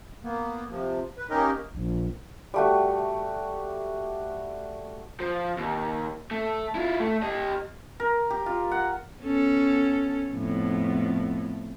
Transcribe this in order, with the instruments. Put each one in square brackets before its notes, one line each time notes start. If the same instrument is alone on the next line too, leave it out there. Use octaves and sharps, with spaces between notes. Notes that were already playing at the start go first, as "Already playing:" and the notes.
[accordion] A#3 B3
C3 F3
B4
A#3 C#4 D#4 G4 A#4 D#5
[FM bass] A#1
[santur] G3 A3 F#4
[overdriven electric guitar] F3
D#2
A3
E4 F4
A3
G4 D#5
[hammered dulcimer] A#4
G4
F4
F#5
[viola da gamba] B3 C#4 A4
F2 A2 B3